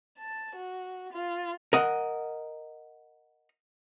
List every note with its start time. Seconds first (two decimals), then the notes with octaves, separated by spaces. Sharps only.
0.18 A5
0.56 F#4
1.12 F4
1.73 A#4 D#5 F#5